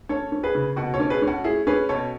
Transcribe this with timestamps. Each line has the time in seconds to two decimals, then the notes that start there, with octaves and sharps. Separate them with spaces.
0.09 C#4 A4 C#5
0.32 C#4
0.43 G#4 B4
0.55 C#3
0.76 B2 F#4 A4
0.94 A4 C#5
1.00 C#4
1.10 G#4 B4
1.22 C#4
1.27 F#4 A4
1.44 A3 E4 G#4
1.67 C#4 G#4 B4
1.89 B2 A4 C#5